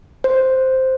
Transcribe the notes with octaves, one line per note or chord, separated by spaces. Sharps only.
C5